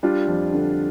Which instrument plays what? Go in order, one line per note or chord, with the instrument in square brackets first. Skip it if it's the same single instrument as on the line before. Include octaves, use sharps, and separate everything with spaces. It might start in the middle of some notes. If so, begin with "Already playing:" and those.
[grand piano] G3 D4 F4
F2
D3